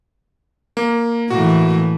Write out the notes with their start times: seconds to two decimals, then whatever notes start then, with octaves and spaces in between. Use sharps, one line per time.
0.77 A#3
1.30 A2 E3 A#3 F#4